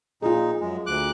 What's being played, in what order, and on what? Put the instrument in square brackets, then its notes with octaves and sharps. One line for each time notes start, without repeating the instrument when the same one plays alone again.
[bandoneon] A#2 D#4 [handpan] F4 G#4
[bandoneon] F#2 G#3
D2 D6 F#6